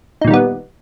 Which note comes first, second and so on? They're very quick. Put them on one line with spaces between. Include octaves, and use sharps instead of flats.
D#4 A#2 D#3 G3 B3